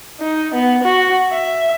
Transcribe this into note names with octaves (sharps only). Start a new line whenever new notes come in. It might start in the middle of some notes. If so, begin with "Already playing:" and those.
D#4
B3
F#4
E5